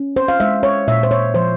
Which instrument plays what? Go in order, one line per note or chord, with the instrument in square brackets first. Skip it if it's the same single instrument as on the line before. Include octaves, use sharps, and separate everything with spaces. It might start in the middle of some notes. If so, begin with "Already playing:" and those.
Already playing: [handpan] C#4
C5
F5
G#3 E5
C#5
A#2 E5
C5
C#5
F3 C5